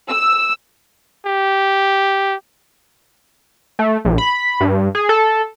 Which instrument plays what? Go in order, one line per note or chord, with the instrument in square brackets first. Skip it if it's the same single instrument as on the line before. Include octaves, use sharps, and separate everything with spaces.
[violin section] E6
[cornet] G4
[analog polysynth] A3
A#1
B5
G2
G#4
A4